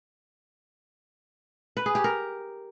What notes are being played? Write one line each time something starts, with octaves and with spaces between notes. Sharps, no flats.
B4
G#4
G4
A#4